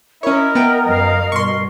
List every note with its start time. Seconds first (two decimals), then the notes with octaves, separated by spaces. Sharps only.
0.23 C#4 E4 A#4 C#5 D#5
0.55 B3 G5
0.86 F#2 F5
1.32 G2 B2 C6 C#6